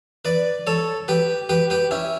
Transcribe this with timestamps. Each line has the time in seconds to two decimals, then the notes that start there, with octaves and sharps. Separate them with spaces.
0.25 B4 D5
0.67 A4 C#5
1.08 G4 B4
1.49 G4 B4
1.70 G4 B4
1.91 C#4 E4